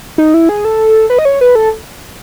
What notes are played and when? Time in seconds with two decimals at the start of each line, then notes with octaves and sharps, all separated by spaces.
0.18 D#4
0.34 E4
0.49 G#4
0.65 A4
1.10 B4
1.19 D#5
1.25 C#5
1.41 B4
1.55 A4